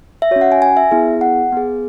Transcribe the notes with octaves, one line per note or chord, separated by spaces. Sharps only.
E5
C#4 F#4 C#5
F#5
G#5
G#5
E5
B3 E4 G#4
F#5
B3 G#4